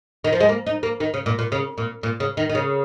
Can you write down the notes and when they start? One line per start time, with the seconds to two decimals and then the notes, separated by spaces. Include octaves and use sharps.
0.24 D#3
0.33 F3
0.40 G#3
0.49 A#3
0.67 D#4
0.83 A#3
1.00 D#3
1.14 C#3
1.26 A#2
1.39 A#2
1.52 C#3
1.78 A#2
2.03 A#2
2.20 C#3
2.37 D#3
2.49 D#3
2.55 C#3